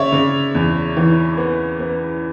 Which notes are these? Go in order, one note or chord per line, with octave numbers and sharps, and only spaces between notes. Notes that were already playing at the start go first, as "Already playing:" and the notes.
Already playing: C#3 C#5 D5 E5
C#3
E2
E3
B3
B3